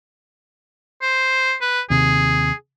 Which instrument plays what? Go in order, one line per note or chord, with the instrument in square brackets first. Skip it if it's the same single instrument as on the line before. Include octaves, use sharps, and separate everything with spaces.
[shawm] C5
B4
[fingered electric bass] D#2 C3 [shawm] G#4